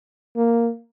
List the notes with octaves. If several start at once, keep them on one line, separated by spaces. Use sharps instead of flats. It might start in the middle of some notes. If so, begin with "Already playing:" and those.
A#3